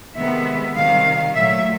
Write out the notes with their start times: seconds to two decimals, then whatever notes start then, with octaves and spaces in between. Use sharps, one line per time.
0.16 C3 D#3 G#3 B3 E5
0.75 C3 D#3 G3 F5
1.34 A#2 F#3 A3 E5